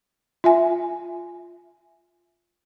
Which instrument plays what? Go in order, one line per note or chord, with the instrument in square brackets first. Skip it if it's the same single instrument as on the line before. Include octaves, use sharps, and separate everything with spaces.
[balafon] F4 E5 G#5